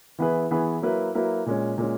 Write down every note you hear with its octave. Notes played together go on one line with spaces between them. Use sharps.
E3 B3 E4 G#4 B4
E3 B3 E4 G#4 B4
F#3 A#3 E4 B4
F#3 A#3 E4 B4
A#2 G#3 C#4
A#2 G#3 C#4